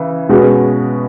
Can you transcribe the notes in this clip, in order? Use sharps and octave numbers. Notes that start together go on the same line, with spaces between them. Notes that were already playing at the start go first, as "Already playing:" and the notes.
Already playing: C#3 E3
B2 G#3 C#4 F#4 B4